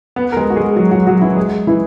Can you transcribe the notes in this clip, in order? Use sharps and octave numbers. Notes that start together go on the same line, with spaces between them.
B3 B4
A#4
G#3 G#4
F#4
G#3 G#4
F#3 F#4
F#3 F#4
F#3 F#4
E3 E4
G#3 G#4
E3 E4